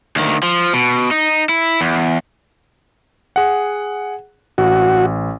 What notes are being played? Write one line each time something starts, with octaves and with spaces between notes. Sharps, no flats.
D2 D#3
F3
B2
D#4
E4
E2
G#4 F#5
A1 F#4